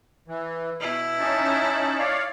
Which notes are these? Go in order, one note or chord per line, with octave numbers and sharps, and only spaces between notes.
E3
B2 E4
C#4 D#4 A5
C#5 D5 F5